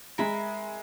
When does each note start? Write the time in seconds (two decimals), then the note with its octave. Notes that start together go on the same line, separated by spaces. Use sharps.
0.18 G#3 A#4 E5 B5